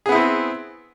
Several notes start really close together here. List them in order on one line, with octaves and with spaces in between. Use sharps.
G#4 B3 E4 C4